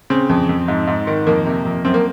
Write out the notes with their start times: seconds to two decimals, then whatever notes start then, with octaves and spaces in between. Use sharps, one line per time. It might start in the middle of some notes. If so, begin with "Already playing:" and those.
0.10 C#3 C4
0.29 F2
0.49 F2
0.68 G#2
0.87 G#2
1.07 D#3
1.27 F2 A#3
1.46 C3
1.65 F2
1.85 F#2 C4
1.94 A#3